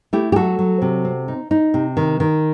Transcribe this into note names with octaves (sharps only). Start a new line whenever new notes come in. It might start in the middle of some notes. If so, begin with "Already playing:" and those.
A3 E4 G4
G4
F#3 F#4 A4
F#3
C3
C4
D#4
D#4
C3
D#3
D#3